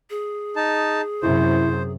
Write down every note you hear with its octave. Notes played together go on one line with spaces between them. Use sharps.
G#4
D#4 A5
F#2 C3 E4 C5